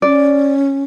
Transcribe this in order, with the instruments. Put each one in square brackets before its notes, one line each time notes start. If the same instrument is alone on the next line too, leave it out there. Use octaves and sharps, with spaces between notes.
[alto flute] C#4 [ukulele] D5